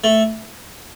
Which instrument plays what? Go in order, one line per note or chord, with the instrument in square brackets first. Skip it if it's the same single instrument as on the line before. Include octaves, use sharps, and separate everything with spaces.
[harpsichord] A3